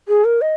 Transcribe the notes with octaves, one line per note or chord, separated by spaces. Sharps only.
G#4
A#4
D#5